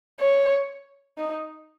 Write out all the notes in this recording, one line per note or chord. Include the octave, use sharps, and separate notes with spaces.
C#5
D#4